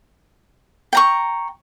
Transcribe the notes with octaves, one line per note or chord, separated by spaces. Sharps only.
G5 A#5 C#6